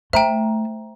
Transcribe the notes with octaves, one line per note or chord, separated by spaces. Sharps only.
A3 C5 E5 G5 A#5